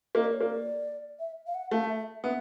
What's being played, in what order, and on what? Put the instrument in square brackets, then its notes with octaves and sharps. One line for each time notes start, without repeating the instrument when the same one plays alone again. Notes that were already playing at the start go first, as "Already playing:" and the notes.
[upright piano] A#3 [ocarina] D#5
[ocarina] D5
C#5
[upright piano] A#3 [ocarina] D5
[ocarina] E5
F5
F#5
[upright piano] A3 [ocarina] F5
[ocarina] E5
[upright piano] B3 [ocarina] E5